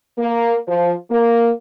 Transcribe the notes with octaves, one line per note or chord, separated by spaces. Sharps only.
A#3
F3
A#3